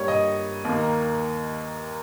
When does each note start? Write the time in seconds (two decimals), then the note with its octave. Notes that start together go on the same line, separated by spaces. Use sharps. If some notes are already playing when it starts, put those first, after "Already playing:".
Already playing: G2 G3 A#3 C#5
0.08 D#5
0.65 D#2 D#3 A#3